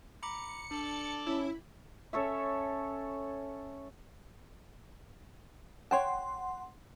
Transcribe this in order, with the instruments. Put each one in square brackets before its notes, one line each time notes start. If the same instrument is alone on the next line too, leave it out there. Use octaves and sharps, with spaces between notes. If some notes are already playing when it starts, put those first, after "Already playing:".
[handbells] A#5 B5 D6 [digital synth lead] C#7
[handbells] D4 [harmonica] A4 D5
[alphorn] C#4 [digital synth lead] E4
[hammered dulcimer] C#4 A4 C#5 E5
[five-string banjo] C#5 G5 A5 [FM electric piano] F#5 C6